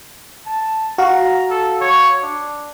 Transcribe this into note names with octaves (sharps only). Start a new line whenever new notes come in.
A5
F#4 F5 A#5
A4
C#5
D4